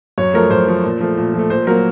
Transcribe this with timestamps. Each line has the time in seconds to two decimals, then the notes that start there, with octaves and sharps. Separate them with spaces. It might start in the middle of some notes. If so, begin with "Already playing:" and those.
0.18 F#2 C#5
0.34 F3 A3 A#4
0.51 F#2 C5
0.67 F3 A3
0.84 A#2
1.01 F3 A3
1.17 A#2
1.34 F3 A3
1.50 A#2 C5
1.67 F#3 A#3 A#4